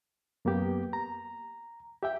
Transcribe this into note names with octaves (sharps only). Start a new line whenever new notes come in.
F#2 A#3 B3 G4
A#5
G4 E5 G5